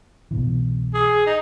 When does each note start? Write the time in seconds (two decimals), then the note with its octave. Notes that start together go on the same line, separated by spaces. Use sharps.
0.31 C2 B2 E3
0.94 G#4
1.27 D#4